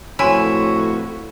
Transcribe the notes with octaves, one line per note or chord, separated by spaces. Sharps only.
F2 A2 E4 F#4 B4 C#5 G#5 C6